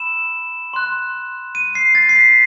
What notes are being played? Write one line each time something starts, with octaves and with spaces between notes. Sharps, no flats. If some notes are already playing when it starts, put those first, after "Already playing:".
Already playing: B5 E6 E7
C6 F#6
D#7
C7
A6
C7
B6